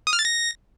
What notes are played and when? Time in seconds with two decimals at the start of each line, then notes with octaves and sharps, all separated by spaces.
0.07 D#6
0.13 F6
0.19 A6
0.25 A#6